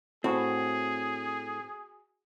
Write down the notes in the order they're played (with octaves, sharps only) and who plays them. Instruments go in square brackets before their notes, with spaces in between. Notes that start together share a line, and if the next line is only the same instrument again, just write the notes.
[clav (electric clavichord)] A2 [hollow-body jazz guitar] C4 [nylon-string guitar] F#4 [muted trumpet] G#4